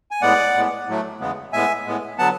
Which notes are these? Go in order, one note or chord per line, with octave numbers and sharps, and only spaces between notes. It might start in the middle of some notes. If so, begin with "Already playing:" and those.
G#5
A2 G#3 B3 D5 F#5
A2 G#3 B3
A2 F#3 A3
E2 C#3 G#3 B3
A2 G#3 B3 E5 G#5
A2 G#3 B3
D3 F#3 B3 F#5 A5